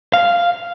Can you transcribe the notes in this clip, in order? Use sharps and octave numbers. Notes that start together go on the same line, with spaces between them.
F5